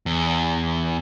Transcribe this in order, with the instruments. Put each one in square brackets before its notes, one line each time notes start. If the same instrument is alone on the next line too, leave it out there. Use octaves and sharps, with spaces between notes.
[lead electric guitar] E2